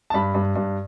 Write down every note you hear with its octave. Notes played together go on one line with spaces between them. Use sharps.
A5
G2 B5
G2
G2